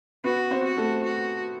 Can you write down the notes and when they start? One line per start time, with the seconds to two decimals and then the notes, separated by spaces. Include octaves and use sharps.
0.24 B3 F#4 B4
0.51 C4 C5
0.64 F#4
0.77 A3 A4
1.04 F#4